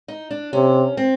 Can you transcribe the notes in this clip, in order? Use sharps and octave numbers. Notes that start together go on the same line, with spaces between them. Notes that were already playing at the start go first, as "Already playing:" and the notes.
D#4
D4
C3 C#4
C4